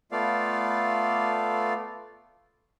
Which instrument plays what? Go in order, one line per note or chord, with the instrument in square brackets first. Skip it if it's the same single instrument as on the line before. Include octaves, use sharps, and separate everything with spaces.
[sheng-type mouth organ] A3 B3 F4 A4 D5 F5